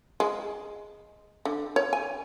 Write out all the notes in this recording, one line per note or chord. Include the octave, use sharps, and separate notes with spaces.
G#3
D3
C#5
G#5